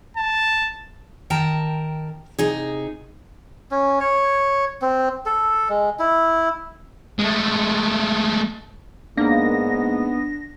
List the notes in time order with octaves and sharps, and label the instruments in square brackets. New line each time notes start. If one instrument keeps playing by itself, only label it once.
[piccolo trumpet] A5
[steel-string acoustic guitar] D#3 A#4 G5 A5 A#5
C3 D#4 G#4
[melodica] C#4
C#5
C4
A4
G#3
E4
[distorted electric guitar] G#3 A3
[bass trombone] G#2 [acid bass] A#3 [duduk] B3 [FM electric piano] D4 A#6